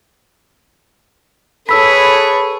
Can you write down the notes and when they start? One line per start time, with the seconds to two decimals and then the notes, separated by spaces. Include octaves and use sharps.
1.69 G#4 A4 B4 C#5 A5 B5 E6 B6